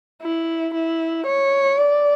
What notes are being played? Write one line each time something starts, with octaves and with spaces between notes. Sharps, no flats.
E4
E4
C#5
D5